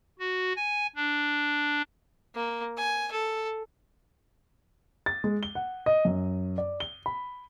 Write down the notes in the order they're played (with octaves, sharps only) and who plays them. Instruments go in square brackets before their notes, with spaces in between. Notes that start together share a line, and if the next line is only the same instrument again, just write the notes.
[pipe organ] F#4
G#5
D4
[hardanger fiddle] A#3
G#5
A4
[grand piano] A6
G#3
G7
F#5
D#5
F#2
D5
G7
B5